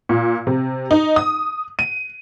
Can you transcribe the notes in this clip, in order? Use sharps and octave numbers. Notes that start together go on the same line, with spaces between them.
A#2
C3
D#4
D#6
D#7